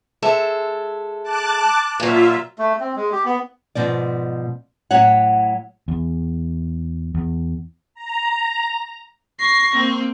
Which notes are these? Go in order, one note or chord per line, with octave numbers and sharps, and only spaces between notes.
G#3 A4 E5
A5 D6 F#6
A#2 F#3 F4 E5
A3
C4
G#3
G4
B3
G#2 B2 F3 D5
A2 F#3 C#5 F#5
E2
E2
A#5
C#6 A#6 C7
A#3 C4